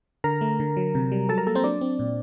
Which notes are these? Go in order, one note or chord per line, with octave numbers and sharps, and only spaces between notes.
D3 A#4 A#5
A3
D3
F#3
C3
G3
F#3 A4 A5
A#4 A#5
A#3 A4 A5
C4 C5
F#3 D4 D5
C4
A#2